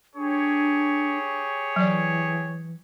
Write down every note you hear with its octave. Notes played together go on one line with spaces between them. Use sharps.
D4 G4 G#4 C#5
E3 F#3 D5